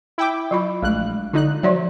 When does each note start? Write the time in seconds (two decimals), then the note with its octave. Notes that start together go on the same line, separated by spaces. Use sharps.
0.18 E4 G5 D6
0.51 F#3 F4 B5
0.83 A#1 G#3 A3 F#6
1.33 D3 D#4 F4 F#6
1.63 F3 F#3 D5 E5